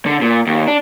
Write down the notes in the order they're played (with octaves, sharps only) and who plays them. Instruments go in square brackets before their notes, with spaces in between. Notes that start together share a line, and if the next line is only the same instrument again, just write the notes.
[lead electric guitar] D3
A#2
D#2
D4